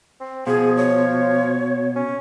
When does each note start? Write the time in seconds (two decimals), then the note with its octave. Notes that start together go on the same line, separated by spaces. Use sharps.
0.20 C4
0.47 B2 F3 G#4
0.77 C#5
1.96 C#4